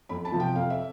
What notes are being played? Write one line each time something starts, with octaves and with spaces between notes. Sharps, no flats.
F2 B5
A5
C3 F3
G5
F2 F5
E5